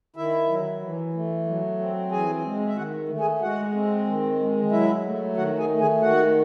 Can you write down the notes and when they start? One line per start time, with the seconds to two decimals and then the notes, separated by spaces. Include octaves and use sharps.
0.16 D#3 E4 E5
0.48 F#3
0.82 E3
1.14 A3
1.47 F#3
1.79 C4
2.12 E3 G#4 G#5
2.45 G#3
2.67 E5
2.76 D#3 F#4 F#5
3.09 A3
3.20 G#4 G#5
3.42 G#3 F#4 F#5
3.74 C4
4.07 D#3
4.39 G#3
4.72 F#3 E4 E5
5.04 A3
5.37 D#3 F#4 F#5
5.59 G#4 G#5
5.69 A3
5.80 G#4 G#5
6.02 D#3 F#4 F#5